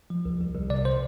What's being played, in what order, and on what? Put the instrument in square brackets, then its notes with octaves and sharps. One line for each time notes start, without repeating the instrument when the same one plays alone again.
[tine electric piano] F3
C2
C2
C2
C3 D5
C5